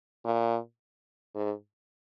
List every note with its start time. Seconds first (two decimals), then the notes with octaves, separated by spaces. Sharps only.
0.25 A#2
1.35 G#2